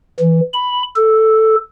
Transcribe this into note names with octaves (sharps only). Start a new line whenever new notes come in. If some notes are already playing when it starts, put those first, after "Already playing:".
E3
B5
A4